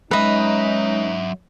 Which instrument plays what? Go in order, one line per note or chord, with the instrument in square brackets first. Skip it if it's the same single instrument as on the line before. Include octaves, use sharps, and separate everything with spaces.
[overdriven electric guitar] F#3 E5 [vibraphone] G#3 [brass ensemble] C#4 D#4 [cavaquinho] B4 D#5